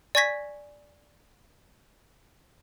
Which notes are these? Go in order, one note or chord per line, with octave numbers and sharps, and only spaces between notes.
D5 G#5 C#6 G#6 A#6 B6